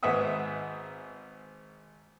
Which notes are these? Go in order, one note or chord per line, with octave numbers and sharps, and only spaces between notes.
G#1 G#2 B4 E5 F#5 D#6